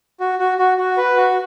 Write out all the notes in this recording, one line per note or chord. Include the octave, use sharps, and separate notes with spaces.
F#4
F#4
F#4
F#4
B4
F#4